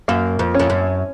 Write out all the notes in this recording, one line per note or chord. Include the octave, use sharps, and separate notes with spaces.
F#2 A#3
F2
C#4
F2
F#2